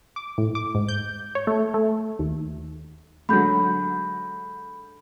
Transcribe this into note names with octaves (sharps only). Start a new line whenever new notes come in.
D6
A2
D6
G#2
G6
C#5
A3
A3
D#2
G#2 D3 F#3 B5 G6